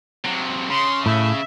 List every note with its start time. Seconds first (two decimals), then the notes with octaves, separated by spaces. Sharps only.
0.25 C3 F#3
0.70 C#3 C6
1.06 A2 E5